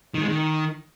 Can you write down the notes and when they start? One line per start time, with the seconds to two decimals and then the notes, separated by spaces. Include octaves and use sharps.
0.14 D#3
0.21 G#3
0.28 D#3